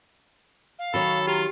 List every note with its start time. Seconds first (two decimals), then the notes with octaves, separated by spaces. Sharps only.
0.78 F5
0.94 D#3 F#3 A4 C#5 B5
1.27 F4 G4 A#5